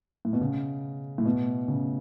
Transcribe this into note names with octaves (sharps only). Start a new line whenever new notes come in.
A2
B2
C#3
A2
B2
C#3